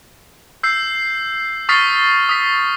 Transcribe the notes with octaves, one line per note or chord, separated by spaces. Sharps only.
E6 G6 C7
C#6 D#6 F6 A6 B6 C7
D#6 B6